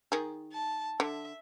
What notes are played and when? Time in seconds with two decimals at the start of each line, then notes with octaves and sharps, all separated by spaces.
0.12 D#3 G#4
0.53 A5
1.00 D3 E5